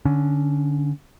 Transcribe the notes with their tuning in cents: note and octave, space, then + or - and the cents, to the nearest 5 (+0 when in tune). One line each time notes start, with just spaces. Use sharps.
D3 +0 C#4 +15